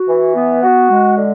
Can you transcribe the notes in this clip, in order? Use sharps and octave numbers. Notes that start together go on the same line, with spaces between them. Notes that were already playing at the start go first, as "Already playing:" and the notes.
Already playing: F#4
E3
B3
F#4
G#3
D3